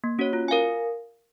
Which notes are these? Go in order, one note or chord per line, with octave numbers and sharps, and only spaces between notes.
A#3
C#4 F#4 C#5
F4
A#4 F5 G#5